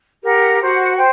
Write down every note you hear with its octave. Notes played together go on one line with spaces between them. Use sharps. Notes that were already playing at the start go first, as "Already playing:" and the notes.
G4 A#4 F#5
F#4 C5 F#5
C5 G5